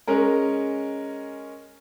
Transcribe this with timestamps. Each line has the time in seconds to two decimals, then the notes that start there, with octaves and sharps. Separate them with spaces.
0.07 G#3 C#4 A#4